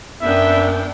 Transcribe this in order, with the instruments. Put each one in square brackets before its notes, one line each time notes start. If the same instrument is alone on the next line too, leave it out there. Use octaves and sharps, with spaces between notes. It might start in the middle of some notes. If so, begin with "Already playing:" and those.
[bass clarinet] F#2 [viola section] B3 D4 G5 [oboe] E5